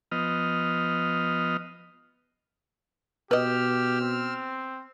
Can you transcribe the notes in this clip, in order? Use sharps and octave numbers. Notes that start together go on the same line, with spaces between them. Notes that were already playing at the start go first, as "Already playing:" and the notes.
F3 B3 D#5 F6
B2 G4 B4 D#5 E6 F6
C4